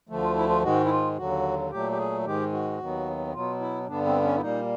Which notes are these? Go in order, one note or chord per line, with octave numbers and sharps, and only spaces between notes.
D2 D3 F3 A3
F4
E4
F4
G#2 D#3 G#3 F#4
E4
F4
D#2 D3 F#3 F#4
A#2 F#3 A3 G4
G4
G#4
G#2 D#3 G#3 G4
F#4
D#2 D#3 F#3 B3
B2 F#3 B3 F4
E4
G2 D3 G3 B3 D4
C4
C#4
E4
A#2 G3 A#3 D#4